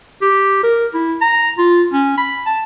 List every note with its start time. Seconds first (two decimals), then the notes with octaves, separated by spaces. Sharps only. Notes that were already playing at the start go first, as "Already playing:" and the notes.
0.22 G4
0.63 A#4
0.94 E4
1.22 A#5
1.58 F4
1.93 C#4
2.18 B5
2.46 A5